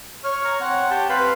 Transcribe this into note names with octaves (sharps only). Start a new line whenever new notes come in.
C#5 F6
A#5
C4 F#5
G4 G5 A5
C4 B4 F5 B5